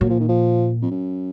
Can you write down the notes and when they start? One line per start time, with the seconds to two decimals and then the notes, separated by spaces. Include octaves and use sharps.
0.01 A#2 F#3
0.10 F3
0.20 D#3
0.29 F3
0.82 F2
0.91 F#2